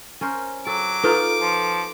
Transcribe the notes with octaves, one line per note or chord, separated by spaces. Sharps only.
C#4 A#4 C5
F#3 A4 D6
D#4 F4 A4 B4
F3